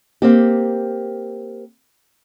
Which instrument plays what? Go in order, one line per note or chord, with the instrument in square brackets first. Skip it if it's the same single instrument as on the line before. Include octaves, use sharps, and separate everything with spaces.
[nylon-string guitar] A#3 C4 G4